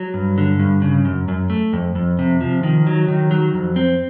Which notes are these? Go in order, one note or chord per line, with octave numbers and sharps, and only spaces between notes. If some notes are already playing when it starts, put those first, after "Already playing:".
Already playing: F#3
G2
D3
G2
C#3
F#2
F#2
A3
F2
F2
C3
F3
D#3
F#3
D#3
F#3
F2
C4